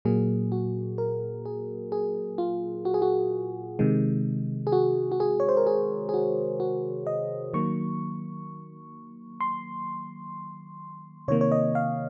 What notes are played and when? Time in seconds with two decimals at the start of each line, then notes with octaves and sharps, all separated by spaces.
0.05 A#2 F#3 A#3 G#4
0.52 F#4
0.98 A#4
1.45 G#4
1.92 G#4
2.38 F4
2.85 F#4
2.94 G#4
3.02 F#4
3.79 C3 D#3 G#3
4.67 G#4
4.72 F#4
5.12 F#4
5.20 G#4
5.40 C#5
5.49 C5
5.57 A#4
5.67 G#4
6.09 G#4
6.14 F#4
6.60 F#4
7.07 D#5
7.53 D#3 F#3 A#3 C#6
9.41 C6
11.28 C3 D#3 A#3 C#5
11.41 C#5
11.52 D#5
11.75 F5